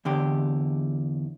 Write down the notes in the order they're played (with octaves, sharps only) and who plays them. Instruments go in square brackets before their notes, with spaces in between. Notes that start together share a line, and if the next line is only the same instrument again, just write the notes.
[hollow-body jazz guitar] E2 D3 G4